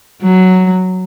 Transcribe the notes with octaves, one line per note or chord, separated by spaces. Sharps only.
F#3